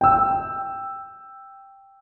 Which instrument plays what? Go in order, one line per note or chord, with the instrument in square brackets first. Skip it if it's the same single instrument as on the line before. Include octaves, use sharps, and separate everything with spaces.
[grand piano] G5 E6